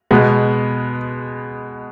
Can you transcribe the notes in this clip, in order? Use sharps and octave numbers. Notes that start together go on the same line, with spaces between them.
B2 G#3 B3